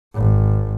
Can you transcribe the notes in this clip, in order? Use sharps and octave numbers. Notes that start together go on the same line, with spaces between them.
G#1